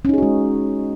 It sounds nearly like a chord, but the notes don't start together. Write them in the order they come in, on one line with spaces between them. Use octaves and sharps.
C#4 D#4 G#4 F#4 G#3